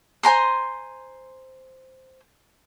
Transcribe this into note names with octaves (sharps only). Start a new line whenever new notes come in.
C5 G#5 A#5 C6